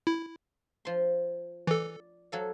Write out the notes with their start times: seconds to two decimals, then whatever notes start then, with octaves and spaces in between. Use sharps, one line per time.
0.07 E4
0.85 F3 C6
1.67 E3 A4 D5
2.32 F#3 A4 F5